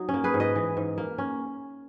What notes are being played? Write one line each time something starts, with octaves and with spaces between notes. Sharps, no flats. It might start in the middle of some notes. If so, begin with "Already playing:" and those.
Already playing: F#3 D#4
C#4
A#3
G#4 B4
G#2
B4 D#5
E3
G#2
A#3
C#4